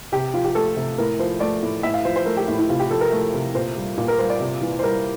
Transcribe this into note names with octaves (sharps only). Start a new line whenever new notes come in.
C3 G4
F3 F4
G4
A3 A4
C3
A2 A#4
F3 C5
A3 D5
A2
A2 E5
F5
F3 C5
C5
A3 A#4
G4
A2 E4
E4
C3 F4
G4
F3 A4
A#4
A3
C3
A#2 C5
G3
A#2
A#4
G3 C5
D5
C3
E3
C5
G3 A#4